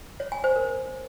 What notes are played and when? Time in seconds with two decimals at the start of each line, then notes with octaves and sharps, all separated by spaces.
0.20 C#5
0.32 G#5
0.44 C5
0.56 A#4